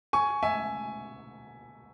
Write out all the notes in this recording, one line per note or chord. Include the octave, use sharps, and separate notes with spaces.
G#5 C#6
E5 G#5